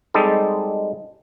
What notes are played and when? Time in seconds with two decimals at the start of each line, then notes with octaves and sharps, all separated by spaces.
0.14 G3 G#3 C4 D#4 G4 A4